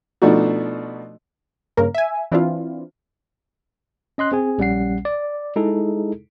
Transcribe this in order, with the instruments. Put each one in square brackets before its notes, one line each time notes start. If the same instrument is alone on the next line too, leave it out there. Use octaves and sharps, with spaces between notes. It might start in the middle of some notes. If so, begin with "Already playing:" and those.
[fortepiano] B2 F3 A3 D4 D#4 F#4
[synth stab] G2 C#3 A#3 A#4
E5 G#5
E3 C4 D4 E4 F4
[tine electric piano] C#4 D#5 C6 F#6
C4 G#4 G#5
A#1 G3 C#4 F#5 C7
D5
G#3 D#4 E4 G#4 A4